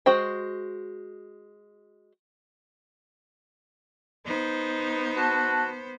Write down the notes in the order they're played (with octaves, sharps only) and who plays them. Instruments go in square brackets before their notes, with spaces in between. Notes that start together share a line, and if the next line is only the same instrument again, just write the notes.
[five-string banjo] G#3 F#4 C5 G5
[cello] B3 C5 [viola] D#4
[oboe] F#4 [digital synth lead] A5